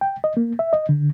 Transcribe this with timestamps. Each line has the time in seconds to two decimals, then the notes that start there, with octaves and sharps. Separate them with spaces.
0.01 G5
0.24 D#5
0.37 A#3
0.59 E5
0.73 D#5
0.89 D3